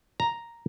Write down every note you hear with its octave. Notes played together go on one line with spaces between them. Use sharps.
A#5